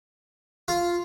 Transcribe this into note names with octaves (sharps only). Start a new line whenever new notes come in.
F4